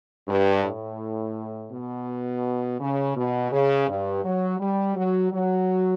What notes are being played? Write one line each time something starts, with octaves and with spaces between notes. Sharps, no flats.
G2
A2
B2
C#3
B2
C#3
G2
F#3
G3
F#3
F#3